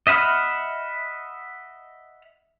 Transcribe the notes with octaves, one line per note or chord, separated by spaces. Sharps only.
D#5 E5 F#5 B5 F6